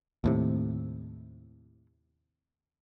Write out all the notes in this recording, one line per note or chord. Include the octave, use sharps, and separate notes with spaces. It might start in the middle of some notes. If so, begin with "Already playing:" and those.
D#2 A2 C3